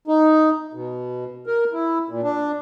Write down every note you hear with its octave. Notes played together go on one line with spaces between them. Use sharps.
D#4
B2
A#4
E4
A#2
D4